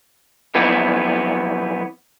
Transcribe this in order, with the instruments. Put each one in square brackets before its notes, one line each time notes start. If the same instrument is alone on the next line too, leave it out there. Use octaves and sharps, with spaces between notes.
[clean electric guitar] B1 F2 E3 B3